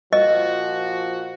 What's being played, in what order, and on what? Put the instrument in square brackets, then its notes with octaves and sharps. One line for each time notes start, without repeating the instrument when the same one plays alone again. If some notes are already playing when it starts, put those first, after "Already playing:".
[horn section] A#2 F3 F#4 [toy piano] D#5